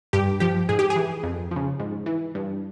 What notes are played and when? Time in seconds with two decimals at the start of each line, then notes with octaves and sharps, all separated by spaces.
0.13 G2 G4
0.40 F3 G4
0.69 G#2 G#4
0.79 G4
0.90 G#4
0.96 E3
1.23 F2
1.51 C#3 F3
1.80 G#2
2.06 E3
2.35 G2